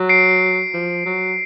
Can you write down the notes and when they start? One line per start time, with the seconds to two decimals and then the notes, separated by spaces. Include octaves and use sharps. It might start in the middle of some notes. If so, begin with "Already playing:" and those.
Already playing: F#3
0.09 C7 D7
0.74 F3
1.06 F#3